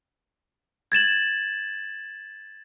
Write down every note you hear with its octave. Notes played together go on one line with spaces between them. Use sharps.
G#6 A6 E7 F#7